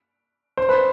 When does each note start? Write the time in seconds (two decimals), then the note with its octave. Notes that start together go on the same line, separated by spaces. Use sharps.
0.57 C5
0.69 B4